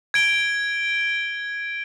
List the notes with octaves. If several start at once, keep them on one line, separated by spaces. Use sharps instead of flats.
G#6 D7 G7